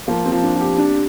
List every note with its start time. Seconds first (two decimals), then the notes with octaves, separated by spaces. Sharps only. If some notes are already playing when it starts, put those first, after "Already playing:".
0.08 F3 A#3
0.26 C4
0.31 F3
0.43 D4
0.55 F3
0.60 G4
0.78 D4